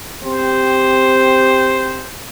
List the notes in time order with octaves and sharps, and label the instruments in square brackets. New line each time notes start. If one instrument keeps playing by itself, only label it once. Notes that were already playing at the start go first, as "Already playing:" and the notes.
[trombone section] C4 G4 [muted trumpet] C5